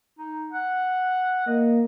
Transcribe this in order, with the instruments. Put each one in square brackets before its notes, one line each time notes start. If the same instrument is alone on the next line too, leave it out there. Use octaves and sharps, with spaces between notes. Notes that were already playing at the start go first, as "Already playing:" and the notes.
[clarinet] D#4
F#5
[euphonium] A#3 [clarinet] D#5